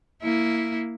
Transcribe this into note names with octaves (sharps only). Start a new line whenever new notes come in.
A#3 E4